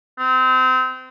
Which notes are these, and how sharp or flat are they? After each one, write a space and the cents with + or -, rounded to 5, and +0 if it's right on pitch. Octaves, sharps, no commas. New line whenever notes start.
C4 -30